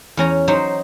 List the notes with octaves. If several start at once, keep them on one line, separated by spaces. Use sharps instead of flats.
E2 C#4 A#5
F#3 D#4 C5